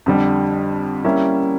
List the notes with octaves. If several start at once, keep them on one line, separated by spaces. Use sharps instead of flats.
F2 D3 G3
G3 A#3 C#4 E4